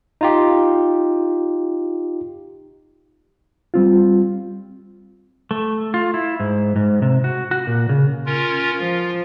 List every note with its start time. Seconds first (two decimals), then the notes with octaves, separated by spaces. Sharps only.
0.21 D#4 F4 G4
3.74 G3 C4 F4
5.51 A3
5.94 F4
6.14 E4
6.40 G#2
6.76 G#2
7.02 C3
7.24 F#4
7.51 F#4
7.67 A#2
7.89 C#3
8.26 C#4 F4 A#4
8.78 F3 F4